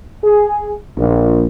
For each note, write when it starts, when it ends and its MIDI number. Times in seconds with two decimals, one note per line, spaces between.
0.22 0.71 68
0.97 1.47 34